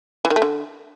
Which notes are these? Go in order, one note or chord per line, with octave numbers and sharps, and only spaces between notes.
E3
D#3
A3
D3